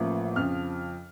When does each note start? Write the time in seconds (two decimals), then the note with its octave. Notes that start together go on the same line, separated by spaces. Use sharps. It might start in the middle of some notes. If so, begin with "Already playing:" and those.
Already playing: A1 A2 F3 A#3 C#4
0.36 F2 C#3 F3 F6